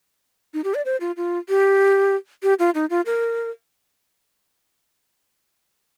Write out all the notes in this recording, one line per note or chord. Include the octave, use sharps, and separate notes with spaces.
D#4
G4
D5
C5
F4
F4
G4
G4
F4
D#4
F4
A#4